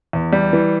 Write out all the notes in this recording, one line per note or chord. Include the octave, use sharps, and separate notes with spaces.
E2
G3
E3